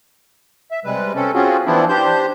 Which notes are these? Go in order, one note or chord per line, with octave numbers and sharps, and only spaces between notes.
E5
C3 G3 G#3 B4
C4 C#4 A4
C4 C#4 F4 F#4 G#4
E3 F3 B3 C4 D4 E4
D4 G4 C5 G6